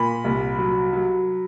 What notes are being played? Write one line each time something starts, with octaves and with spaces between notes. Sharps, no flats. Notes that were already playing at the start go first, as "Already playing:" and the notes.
Already playing: A#2 B5
C2
F#3
F#3